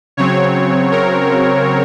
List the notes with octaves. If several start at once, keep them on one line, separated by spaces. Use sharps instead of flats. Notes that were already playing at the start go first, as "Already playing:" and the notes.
C#3 F#3 C4 C#5
A#4